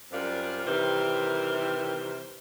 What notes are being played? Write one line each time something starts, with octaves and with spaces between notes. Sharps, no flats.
F#2 G3 C4 F4 A#4 D5
C3 D#3 E3 G3 A#4 C5